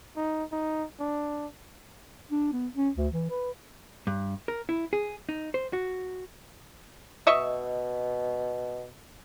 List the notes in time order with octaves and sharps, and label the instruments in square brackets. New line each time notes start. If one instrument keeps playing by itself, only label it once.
[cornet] D#4
D#4
D4
[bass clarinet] D4
B3
C#4
D2
E3
B4
[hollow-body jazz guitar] G2
A#4
E4
G#4
D#4
C5
F#4
[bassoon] B2 [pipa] D#5 E5 C#6